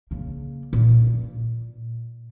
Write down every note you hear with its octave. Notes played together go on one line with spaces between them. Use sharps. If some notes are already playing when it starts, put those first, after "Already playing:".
C#3 A#3
A#2
A#2